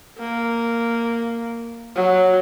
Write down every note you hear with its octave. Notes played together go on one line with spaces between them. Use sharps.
A#3
F#3